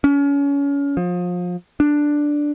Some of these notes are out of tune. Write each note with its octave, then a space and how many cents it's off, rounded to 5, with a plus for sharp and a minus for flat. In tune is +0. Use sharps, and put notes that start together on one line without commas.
C#4 +30
F3 +30
D4 +0